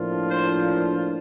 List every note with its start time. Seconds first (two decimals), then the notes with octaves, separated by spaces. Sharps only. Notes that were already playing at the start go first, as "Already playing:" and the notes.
Already playing: A2 F3 A#3 D4 F4
0.31 C5